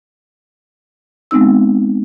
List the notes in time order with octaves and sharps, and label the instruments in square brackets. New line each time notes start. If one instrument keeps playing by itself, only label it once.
[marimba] G#3 B3 C4 D#4 E6